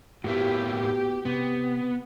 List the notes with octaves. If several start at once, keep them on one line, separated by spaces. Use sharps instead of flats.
A2 A#3 B3 E4 F#4 G4
C3 B3